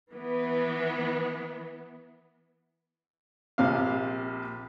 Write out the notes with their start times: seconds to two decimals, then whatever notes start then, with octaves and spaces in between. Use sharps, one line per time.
0.11 E3 B3
3.58 A#1 C3 F5